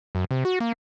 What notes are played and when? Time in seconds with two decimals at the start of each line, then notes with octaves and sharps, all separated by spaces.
0.15 F#2
0.31 C3
0.45 F#4
0.60 A#3